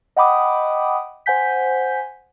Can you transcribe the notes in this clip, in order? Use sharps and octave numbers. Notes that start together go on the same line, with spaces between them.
D#5 F#5 G5 B5 D6 D#6
C5 F#5 G#5 G6 B6